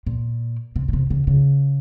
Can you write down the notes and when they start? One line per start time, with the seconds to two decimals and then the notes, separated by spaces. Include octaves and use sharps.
0.07 A#2
0.76 C3
0.88 A#2
0.93 C3
1.10 C#3
1.27 C#3